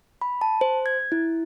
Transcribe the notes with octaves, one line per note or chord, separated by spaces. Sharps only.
B5
A5
C5
G#6
E4